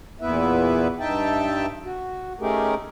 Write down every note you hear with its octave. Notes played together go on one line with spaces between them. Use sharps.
E2 A#2 B3 E4 B4 E5
G2 D#4 E5 G5 A5
F#4
A3 C#4 D#4 G4 G#4 A#4